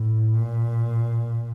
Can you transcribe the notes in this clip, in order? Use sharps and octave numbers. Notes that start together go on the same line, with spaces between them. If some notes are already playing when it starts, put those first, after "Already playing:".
Already playing: A2
A#2